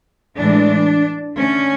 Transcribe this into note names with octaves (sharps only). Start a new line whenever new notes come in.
A2 E3 G#3 D4
D3 A3 C#4